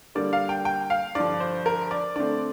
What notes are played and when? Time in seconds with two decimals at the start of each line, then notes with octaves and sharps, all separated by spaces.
0.15 D3 G3 A#3 D5
0.33 F5
0.49 G5
0.65 G5
0.90 F5
1.15 G2 D3 F3 D5
1.40 C5
1.66 A#4
1.91 D5
2.16 D3 A3 C4 D5